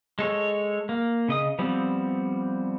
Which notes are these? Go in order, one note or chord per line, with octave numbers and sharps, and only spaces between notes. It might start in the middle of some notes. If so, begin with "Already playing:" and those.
G#3 A4 C#5
A#3
C#3 D#5 D#6
F3 G3 B3 C4